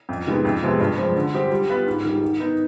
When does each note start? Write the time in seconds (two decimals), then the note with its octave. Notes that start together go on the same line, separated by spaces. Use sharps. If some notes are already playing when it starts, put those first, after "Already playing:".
0.09 F2
0.27 C3 D#3 G#3 B3
0.45 F2
0.63 C3 F3 G#3 B3
0.80 G2
0.98 F3 G#3 C4
1.16 D3
1.34 G3 C4 G4
1.52 G3
1.69 B3 F4 B4
1.87 G#2
2.05 D#3 G3
2.23 D#3
2.40 B3 D#4